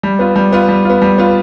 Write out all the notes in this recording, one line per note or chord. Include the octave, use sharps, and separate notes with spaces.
G3
B3 F4
G3
B3 F4
G3
B3 F4
G3
B3 F4